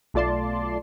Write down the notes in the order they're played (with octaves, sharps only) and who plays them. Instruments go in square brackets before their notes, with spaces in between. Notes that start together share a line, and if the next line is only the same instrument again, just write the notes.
[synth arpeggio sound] B1 A3 F4 D5 A5 C6